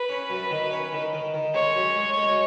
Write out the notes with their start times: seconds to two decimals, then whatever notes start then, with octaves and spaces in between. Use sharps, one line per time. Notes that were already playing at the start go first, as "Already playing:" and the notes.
Already playing: B4
0.09 C#4
0.30 F#2
0.50 D#3
0.71 C#4
0.92 D#3
1.13 D#3
1.34 D#3
1.54 G#3 C#5
1.75 F#2
1.96 G#3
2.17 G#3